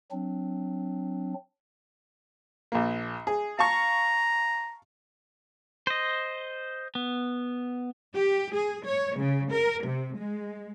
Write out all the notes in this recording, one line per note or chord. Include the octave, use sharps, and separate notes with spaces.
F#3 C4 D4
A#1 A#3
G#4
F5 A5 A#5 C#6
C5 D#5
B3
G4
G#4
C#5
C#3
A#4
C3
G#3